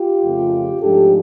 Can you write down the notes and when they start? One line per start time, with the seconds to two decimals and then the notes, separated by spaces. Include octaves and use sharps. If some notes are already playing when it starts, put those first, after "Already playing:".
Already playing: F4 G4
0.24 F2 C#3 F3 A3
0.82 G#2 F3 A3 D4 G4 A4